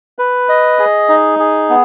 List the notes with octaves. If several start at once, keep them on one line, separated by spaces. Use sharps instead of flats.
B4
D#5
G#4
D#4
G#4
B3